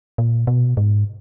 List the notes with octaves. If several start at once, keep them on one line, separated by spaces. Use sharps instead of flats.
A#2
B2
G#2